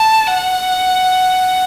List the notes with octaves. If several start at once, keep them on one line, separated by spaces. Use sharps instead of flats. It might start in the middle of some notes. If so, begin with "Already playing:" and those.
Already playing: A5
F#5